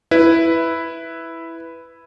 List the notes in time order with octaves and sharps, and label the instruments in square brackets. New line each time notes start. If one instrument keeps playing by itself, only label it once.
[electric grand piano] E4 B4